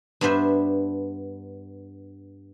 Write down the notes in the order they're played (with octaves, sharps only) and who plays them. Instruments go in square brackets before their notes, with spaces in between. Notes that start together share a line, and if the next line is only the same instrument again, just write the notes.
[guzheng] G2 B3 D4 C5 E5